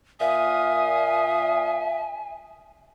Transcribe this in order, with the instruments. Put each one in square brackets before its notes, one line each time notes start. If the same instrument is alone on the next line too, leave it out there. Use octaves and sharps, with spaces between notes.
[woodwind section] A#2 F5 D#6 [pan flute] E5 [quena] G#5